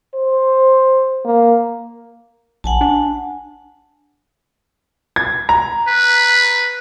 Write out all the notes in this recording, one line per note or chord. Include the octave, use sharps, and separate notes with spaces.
C5
A#3
A#1 F#5 G#5 A5
D4
G#6
A#5
B4